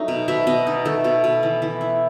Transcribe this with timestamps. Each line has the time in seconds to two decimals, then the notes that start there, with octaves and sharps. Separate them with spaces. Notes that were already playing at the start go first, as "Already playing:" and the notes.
Already playing: F#3 A3 D#4
0.08 B2
0.28 B2 E5
0.47 B2 D#5
0.67 D#4
0.85 A3 A4
1.04 B2
1.24 B2
1.43 E3
1.62 E3
1.81 E4